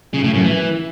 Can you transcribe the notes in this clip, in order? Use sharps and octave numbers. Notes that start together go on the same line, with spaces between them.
C#3
A2
F#2
E3